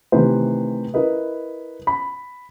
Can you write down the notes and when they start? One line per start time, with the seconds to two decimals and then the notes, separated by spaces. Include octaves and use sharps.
0.12 C3 D#3 E3 A3 B4 C5
0.94 E4 A#4 B4 D#5
1.87 B5